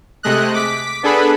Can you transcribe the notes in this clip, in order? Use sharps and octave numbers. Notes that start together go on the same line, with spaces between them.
C3 G#3 A3 D#5 F#6
D6 B6
B3 D4 G#4 A4 B4 B5